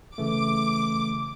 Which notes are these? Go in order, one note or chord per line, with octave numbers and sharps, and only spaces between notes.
C#3 E3 A3 D6